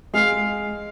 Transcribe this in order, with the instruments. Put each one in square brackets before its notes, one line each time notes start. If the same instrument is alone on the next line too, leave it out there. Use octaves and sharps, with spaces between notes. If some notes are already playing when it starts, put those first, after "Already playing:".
[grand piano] G#3 [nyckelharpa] F5